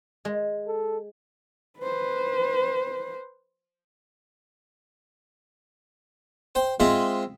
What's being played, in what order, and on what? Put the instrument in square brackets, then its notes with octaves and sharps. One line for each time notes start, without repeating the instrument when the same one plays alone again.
[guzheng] G#3
[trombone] A4
[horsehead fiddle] B4 C5
[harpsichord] C5 G5
G#3 C4 F4 G#4 E5